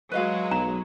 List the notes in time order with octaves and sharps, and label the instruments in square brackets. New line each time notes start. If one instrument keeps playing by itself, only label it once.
[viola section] F#3 G#3 [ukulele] B4 D#5 F5
[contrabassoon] B1 [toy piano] A#5